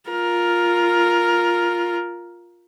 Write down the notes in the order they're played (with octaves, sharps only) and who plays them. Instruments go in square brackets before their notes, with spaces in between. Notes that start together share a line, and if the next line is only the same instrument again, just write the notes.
[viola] F4 A#4